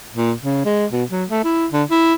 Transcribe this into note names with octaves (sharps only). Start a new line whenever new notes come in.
A#2
C#3
G#3
B2
F#3
A3
E4
D3
E4